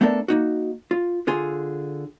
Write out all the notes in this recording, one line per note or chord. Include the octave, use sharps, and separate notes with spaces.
A3 B3 D4 A4 A#4 D5
A#3 D#4 F#4
F4
D3 F4 G#4 C6